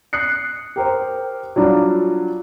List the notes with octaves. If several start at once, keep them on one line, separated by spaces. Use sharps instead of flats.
D#6 F#6 C7 C#7
G4 A#4 C5
F#3 G3 D4 F4